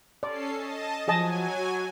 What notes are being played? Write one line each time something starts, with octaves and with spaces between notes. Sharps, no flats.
C#4 A4 D5 C7
D#5 A5
F3 F#3 G#4 D#5 G#5 A5
F#4